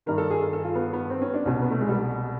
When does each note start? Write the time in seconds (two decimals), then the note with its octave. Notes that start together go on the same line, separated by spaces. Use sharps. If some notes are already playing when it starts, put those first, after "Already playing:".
0.06 G2 D#3 A#4
0.18 A4
0.30 G#4
0.41 A4
0.53 A4
0.65 F4
0.75 B3
0.93 B3
1.10 C4
1.22 C#4
1.34 D4
1.45 C2 B2 C#4
1.62 B3
1.71 A3
1.80 G#3
1.88 G3